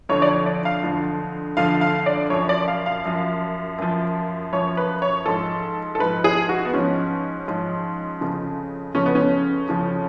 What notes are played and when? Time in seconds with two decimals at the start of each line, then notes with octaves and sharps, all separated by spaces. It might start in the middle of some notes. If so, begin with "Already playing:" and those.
0.09 F2 D3 F3 C#5
0.22 D5
0.28 C#5
0.46 D5
0.65 F5
0.83 F2 D3 F3
1.57 F2 D3 F3 F5
1.81 F5
2.06 D5
2.30 F#2 F3 C#5
2.49 D5
2.68 F5
2.86 F5
3.05 F#2 F3
3.78 F#2 F3
4.53 F#2 F3 C#5
4.77 B4
5.02 C#5
5.26 G#2 F3 A4
5.95 A4
5.99 G#2 F3 B4
6.24 G#4
6.49 F#4
6.65 B3
6.74 G#2 F3 C#4
7.48 G#2 F3
8.21 F2 C#3 F3
8.95 F2 C#3 F3 C#4
9.06 B3
9.15 C#4
9.68 F2 C#3 F3